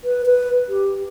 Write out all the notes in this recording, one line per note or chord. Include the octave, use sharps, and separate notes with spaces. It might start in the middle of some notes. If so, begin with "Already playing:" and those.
B4
B4
G4